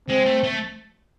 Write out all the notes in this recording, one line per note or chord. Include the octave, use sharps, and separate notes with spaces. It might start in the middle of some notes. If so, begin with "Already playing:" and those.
G#3 C4
A3
A3